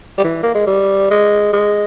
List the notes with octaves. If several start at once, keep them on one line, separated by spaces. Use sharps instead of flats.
G3
E3
A#3
G#3
G3
G#3
G#3